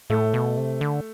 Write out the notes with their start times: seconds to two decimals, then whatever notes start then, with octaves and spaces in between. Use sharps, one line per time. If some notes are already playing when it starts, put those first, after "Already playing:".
0.10 A2 A3
0.34 B2
0.57 C3
0.81 D3